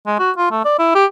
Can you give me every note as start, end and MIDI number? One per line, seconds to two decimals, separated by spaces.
0.07 0.17 56
0.19 0.31 66
0.37 0.48 65
0.51 0.62 57
0.65 0.76 74
0.79 0.92 64
0.95 1.05 67